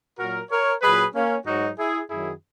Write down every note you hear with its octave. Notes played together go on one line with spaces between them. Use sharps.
A#2 F#3 F#4 A#4
A#4 C#5
A#2 F#3 G#4 B4
A#3 C#4
G#2 F#3 D#4 F#4
E4 G#4
F#2 D#3 F#3 E4 G#4